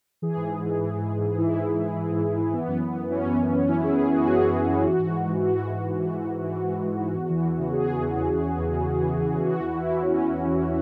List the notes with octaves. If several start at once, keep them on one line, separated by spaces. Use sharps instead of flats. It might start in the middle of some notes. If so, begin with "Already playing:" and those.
E3 G#4
G#2
G#2
E3
E3
G#2
G#2
E3
E3 E4
G#2
G#2
E3
E3
G#2
G#2
E3
E3 B3
F#2
F#2
E3
E3 C#4
F#2
F#2
E3 C#4
E3 E4
F#2 G#4
F#2 G#4
E3 F#4
E3 G#4
F#2
F#2
E3
E3 F#4
G#2
G#2
E3
E3 F#4
G#2
G#2
E3
E3
G#2
G#2
E3
E3
G#2
G#2
E3
E2
E3
E2
C#3
E2 G#4
E3
E2
C#3
E2
E3
E2
C#3
E2
E3
E2
C#3
E3 F#4
E2
E2 E4
E3
E3 C#4
E2
E2
E3
E3